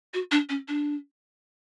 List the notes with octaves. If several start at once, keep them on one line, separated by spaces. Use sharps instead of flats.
F#4
D4
C#4
D4